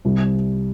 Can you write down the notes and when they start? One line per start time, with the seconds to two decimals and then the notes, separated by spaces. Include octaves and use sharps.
0.05 C2 C3 G3